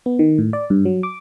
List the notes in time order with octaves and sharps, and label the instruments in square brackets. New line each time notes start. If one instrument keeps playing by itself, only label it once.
[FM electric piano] B3
D#3
A2
D5
G2
F#3
D6